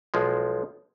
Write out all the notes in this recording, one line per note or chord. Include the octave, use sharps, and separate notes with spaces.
B1 F3 G#3